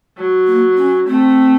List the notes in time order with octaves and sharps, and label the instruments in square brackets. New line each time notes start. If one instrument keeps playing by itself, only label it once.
[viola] F#3
[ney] A#3
C#4
[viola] A3 [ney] C4